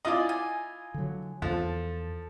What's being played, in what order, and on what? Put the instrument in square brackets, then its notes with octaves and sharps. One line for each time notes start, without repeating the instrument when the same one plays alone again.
[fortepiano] E4 F4 D#5 [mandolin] D5 G#5
[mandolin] G#5
[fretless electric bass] D3 F#3
[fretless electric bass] E2 [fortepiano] F3 [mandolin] A4